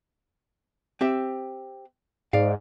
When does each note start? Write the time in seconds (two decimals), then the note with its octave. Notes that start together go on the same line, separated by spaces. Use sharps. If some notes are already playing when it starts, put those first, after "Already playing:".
1.01 C4 G4 E5
2.33 G#2 D5 F5